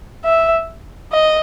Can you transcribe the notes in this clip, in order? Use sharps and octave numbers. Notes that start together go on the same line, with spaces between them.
E5
D#5